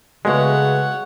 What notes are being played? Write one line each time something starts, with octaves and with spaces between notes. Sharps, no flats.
C#3 G#3 A3 B3 F#4 C#5 F#5